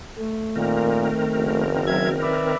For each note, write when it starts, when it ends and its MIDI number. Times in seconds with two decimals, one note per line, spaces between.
0.18 1.64 57
0.56 1.09 46
0.56 2.56 51
0.56 2.56 60
0.56 2.56 70
1.35 2.33 30
1.87 2.09 54
1.87 2.09 76
1.87 2.09 92
2.22 2.57 71
2.22 2.57 74
2.22 2.57 76